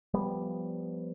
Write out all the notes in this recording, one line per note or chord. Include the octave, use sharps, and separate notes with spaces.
F3 G3 B3